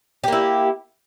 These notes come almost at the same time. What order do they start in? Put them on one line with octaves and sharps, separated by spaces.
G4 A#3 E4